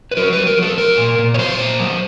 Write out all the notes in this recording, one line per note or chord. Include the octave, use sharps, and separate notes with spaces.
B4
F#3 A#4
F#3 B4
A#4
F#3 A4
F#3 A#4
A#2
A#2
C#5
F#3 C5
A#2
F#3